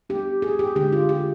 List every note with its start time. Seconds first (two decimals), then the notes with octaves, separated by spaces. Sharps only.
0.09 G3 B3 D4 G4
0.42 G#4
0.59 G4
0.76 D3 G#3 D4 G4
0.92 F4
1.09 G4